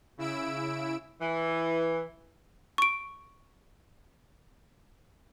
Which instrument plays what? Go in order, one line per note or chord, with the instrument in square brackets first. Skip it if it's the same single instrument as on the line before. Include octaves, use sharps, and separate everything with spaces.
[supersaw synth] C#3 E4 E6 D7
[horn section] E3
[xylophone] C#6 D7